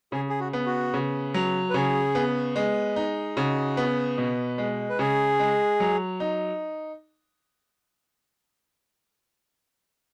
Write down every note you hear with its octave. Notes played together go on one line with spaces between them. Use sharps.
C#3 G#4
G#4
F#4
B3
F#4
C#3
F#3
B4
C#3 G#4
B3
G#3
D#4
C#3 F#4
B3
B2
G#3
B4
C#3 G#4
G#3
F#3
D#4